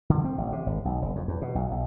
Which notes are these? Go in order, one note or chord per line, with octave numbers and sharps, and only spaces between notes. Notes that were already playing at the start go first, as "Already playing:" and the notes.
D3
C4
A1
C3
G#1
B1
F#1
F2
E2
B2
B1
B1